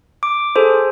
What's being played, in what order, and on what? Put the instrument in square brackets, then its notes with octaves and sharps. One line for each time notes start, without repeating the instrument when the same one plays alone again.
[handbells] D6
G#4 A4 C5